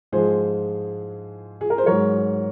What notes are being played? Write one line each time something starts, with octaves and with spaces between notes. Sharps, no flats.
G#2 F3 G#3 G#4 C5
G#4
A#4
C5
G#2 F#3 A#4 C#5